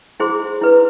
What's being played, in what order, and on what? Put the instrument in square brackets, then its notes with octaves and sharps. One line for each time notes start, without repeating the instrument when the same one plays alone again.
[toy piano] E4 G#4 C5 C6
E4 B4